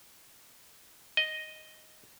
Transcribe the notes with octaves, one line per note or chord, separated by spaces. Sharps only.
D#5